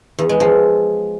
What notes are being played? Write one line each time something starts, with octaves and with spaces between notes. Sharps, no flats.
E2
G#3
F3